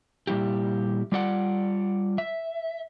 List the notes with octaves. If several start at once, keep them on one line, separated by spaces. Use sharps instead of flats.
A#2 G3 G#3 E4 G4
G3 F4 D5 F#5
E5